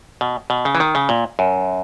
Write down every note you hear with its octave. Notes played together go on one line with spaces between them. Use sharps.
B2
B2
C#3
E3
D#3
C#3
A#2
F#2